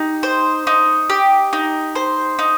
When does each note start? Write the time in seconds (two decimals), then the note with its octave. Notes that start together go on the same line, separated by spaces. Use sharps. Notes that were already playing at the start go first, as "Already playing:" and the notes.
Already playing: D#4 G4
0.23 C5
0.67 D#4
1.10 G4
1.53 D#4
1.95 C5
2.39 D#4